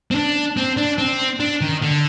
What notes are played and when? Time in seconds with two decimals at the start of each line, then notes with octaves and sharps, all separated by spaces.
0.11 C4
0.15 D4
0.57 C4
0.77 D4
0.98 C4
1.40 D4
1.61 D#3
1.82 D3